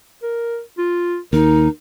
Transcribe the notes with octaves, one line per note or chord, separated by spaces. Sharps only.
A#4
F4
D#2 D#4 A#4